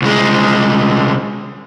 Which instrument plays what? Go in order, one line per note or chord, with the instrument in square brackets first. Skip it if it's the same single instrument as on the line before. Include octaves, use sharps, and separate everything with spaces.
[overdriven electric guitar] C2 G#3